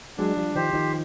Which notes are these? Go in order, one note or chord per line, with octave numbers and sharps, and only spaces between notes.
F#3 G#3 D4
F3 G3
D#3 F3 G4 C5
D#3 F3